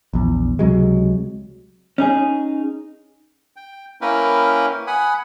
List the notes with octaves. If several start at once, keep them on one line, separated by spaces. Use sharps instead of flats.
A#1 E2
C#2 C3 F#3 G#3
C#4 D#4 G#4
G5
A#3 C#4 E4 A#4 B4 G5
F#5 G#5 B5 D#6